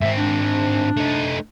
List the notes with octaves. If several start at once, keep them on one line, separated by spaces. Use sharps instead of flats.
G#2 C4 E5
D4
A3 D#4